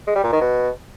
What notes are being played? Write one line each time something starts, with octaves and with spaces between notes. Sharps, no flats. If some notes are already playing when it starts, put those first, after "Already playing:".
G#3
G3
A#2
D#3
B2